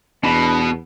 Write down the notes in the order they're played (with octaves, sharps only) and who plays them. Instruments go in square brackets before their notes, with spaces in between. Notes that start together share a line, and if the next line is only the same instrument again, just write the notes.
[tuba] E2 [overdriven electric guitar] B2 [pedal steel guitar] D4 B5